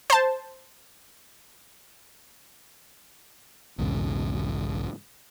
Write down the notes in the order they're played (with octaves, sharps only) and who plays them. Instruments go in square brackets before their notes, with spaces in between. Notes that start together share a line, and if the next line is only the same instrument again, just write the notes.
[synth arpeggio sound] C5 A5
[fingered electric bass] B1 E2 G#2 C#3